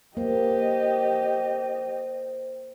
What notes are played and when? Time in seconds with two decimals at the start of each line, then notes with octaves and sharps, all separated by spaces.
0.17 A#3 G4 C5 D#5